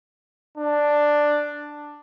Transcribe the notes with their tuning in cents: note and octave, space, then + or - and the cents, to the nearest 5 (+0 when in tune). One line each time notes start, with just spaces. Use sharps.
D4 +5